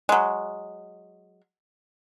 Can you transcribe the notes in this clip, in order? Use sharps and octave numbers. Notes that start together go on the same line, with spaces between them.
F#3 G#3